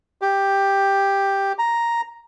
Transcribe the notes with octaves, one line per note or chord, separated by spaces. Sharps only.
G4
A#5